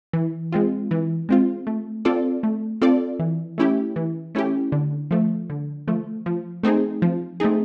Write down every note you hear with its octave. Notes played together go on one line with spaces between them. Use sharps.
E3
G#3 C4 F4
E3
G#3 C4 F4
A3
C4 F4 A4 D5
A3
C4 F4 A4 D5
E3
A3 C#4 E4 G4
E3
A3 C#4 E4 G4
D3
F3 A3
D3
F3 A3
F3
A3 C4 D#4 G#4
F3
A3 C4 D#4 G#4